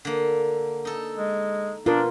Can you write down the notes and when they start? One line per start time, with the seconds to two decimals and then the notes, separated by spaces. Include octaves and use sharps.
0.05 D3 A#3
0.85 D#4 A4
1.16 G#3
1.86 B2 D4 F4 A#4